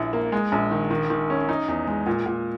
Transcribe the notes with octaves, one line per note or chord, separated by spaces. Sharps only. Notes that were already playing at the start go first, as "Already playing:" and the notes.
Already playing: A#1 E4
A#3
G#3
A#1
D#3
D#3
D#3
C#4
D#4
E2
G#3
A#2
A#2